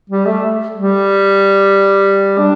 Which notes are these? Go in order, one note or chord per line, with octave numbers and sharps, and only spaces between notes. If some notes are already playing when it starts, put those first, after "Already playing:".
G3
A3
G3
D4